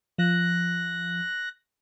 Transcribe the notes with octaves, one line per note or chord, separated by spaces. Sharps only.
F3 F#6 A#6